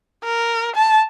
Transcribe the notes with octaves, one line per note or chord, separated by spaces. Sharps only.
A#4
A5